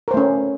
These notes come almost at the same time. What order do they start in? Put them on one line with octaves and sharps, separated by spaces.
A#4 C5 A3 C#4